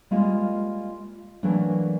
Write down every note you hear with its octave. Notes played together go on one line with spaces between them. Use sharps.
G3 G#3 A#3 F4
E3 F#3 A3 A#3 D4